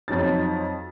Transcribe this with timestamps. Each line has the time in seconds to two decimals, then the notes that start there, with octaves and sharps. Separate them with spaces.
0.08 F2 F#3 D#4 A6